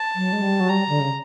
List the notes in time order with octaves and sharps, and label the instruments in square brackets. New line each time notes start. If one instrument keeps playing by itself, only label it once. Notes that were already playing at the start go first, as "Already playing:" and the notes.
Already playing: [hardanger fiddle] A5
[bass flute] F#3
G#3
G3
F#3
[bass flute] G3 [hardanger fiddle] A#5
[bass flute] D3
C#3